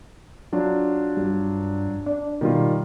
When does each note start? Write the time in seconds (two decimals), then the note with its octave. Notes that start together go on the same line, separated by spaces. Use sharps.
0.52 F#3 D4 F4
1.17 G2
2.06 D4
2.41 B2 D#3 G3 F4